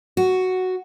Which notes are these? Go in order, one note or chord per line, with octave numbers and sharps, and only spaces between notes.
F#4